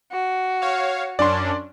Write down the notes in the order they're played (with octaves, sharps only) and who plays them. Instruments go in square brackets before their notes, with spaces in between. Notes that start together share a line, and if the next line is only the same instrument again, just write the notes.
[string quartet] F#4
[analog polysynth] C#5 F5
[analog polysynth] F#2 C#4 D4 [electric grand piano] D5 C6